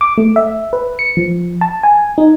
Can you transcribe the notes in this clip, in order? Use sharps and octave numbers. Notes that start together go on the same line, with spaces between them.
D6
A3
E5
B4
C#7
F3
A5
G#5
D#4